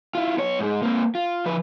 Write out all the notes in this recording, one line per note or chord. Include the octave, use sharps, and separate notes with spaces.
E4 F4
B3 C#5
G#2 G#3
A#3 C4
F4
F3 B4